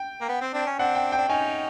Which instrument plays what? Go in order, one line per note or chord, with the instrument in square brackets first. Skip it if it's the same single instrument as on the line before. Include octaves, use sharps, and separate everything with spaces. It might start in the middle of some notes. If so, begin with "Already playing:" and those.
Already playing: [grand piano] G5
[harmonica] A#3
B3
C4
C4 D4
C#4
[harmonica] C4 D4 [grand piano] F#5
[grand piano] G5
G5
[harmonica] D4
[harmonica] C#4 D#4 [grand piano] G#5